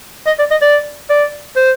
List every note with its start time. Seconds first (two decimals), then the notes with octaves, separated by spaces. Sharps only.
0.27 D#5
0.39 D5
0.51 D#5
0.62 D5
1.10 D5
1.56 C5